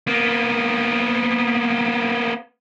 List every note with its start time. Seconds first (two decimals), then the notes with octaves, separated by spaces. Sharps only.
0.07 A#3 B3